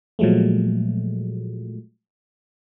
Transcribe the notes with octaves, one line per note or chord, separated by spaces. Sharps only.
A#2 F3 F#3 G#3 A3